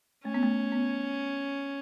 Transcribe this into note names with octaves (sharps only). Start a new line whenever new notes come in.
A3 C#4
B3
A3
B3